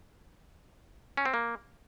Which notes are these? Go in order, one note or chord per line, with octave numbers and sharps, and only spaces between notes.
C#4
C4
A#3